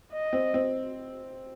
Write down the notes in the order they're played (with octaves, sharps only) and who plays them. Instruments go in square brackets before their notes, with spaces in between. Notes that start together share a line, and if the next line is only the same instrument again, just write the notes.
[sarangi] D#5
[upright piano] C4
C4